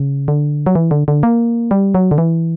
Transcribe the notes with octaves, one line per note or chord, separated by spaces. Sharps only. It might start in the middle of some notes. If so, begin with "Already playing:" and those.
Already playing: C#3
D3
F#3
E3
D3
D3
A#3
G3
F#3
D3
E3